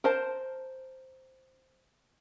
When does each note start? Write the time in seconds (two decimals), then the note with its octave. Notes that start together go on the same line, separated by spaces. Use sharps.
0.04 A#4 C5 A5